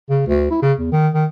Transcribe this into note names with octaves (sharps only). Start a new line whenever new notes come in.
C#3
D2
E4
C#3
E2
D#3
D#3